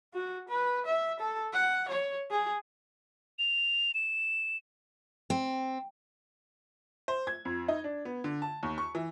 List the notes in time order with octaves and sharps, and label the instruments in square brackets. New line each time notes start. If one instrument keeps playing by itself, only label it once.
[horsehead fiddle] F#4
B4
E5
A4
F#5
C#5
G#4
[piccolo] F7
E7
[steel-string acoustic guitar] C4
[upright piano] C5
G#6
F2
D#4
D4
B3
D3
A5
D#2
C#6
E3